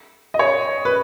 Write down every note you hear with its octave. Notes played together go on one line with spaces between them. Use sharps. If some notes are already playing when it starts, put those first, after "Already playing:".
D#5
C#5
B4